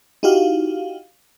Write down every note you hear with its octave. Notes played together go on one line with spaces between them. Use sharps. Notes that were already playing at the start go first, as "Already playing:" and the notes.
D#4 E4 F#4 G4 F5